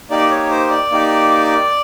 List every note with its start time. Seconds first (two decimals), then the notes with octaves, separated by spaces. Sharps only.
0.10 A#3 D#4 G4 D5
0.30 C#5
0.51 C5
0.70 D5
0.91 A#3 D#4 G4